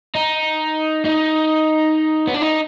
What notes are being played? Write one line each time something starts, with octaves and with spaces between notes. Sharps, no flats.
D#4
D#4
B3
D4
D#4